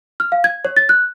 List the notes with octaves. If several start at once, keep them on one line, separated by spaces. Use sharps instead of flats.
F6
F5
G#6
C#5
A6
F#6